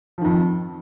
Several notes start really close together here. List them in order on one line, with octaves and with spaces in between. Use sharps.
F3 D#3 F2